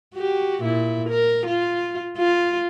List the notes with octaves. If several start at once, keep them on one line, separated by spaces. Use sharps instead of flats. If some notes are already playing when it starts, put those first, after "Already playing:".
F#4 G4
A#2 E4
A#4
F4
F4